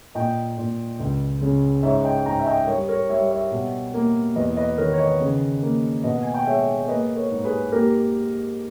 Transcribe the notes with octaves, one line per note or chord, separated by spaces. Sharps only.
A#2 D#5 G5
A#2
C#2
C#3
G#2 C#5 E5
D#5 G5
G#2 G5 A#5
E5
D#5 G5
G3 A#4 C#5
A#4 C#5
G3 C#5 E5
C#5 E5
B2
A#3
E2 B4 D#5
B4 D#5
D#3 A#4 C#5
C#5
B4 D#5
C#3
A#3
B2 B4 D#5
G#5
G5
G#3 C#5 E5
A#3 B4 D#5
A#4 C#5
G#2
G#4 B4
A#3 G4 A#4